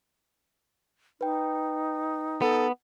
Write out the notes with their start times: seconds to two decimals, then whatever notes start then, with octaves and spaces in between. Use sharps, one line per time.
1.21 D#4 B4 G5
2.42 B3 A4